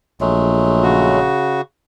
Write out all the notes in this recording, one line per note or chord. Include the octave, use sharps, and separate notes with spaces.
A#1 F#3 G#3 A3
C#3 F#4